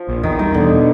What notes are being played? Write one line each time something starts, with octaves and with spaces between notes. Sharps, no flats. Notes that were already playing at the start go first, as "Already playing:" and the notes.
Already playing: F3
A#1
E2 D#3
D#3 G3
B2 D3